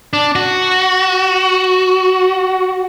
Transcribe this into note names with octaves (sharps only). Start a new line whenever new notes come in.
D4
F#4